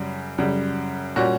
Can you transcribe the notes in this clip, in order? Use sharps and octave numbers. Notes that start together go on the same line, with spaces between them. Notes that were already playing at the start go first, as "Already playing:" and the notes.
Already playing: F#2 C#3 G3
F#2 C#3 G3
A#2 G3 C#4 F#4